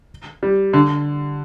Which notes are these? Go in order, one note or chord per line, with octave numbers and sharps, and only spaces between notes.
G3
D3